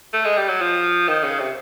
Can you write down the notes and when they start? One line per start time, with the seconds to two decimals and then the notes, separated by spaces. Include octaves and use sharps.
0.13 A3
0.25 G#3
0.37 G3
0.48 F#3
0.61 F3
1.08 D#3
1.23 C#3
1.39 C3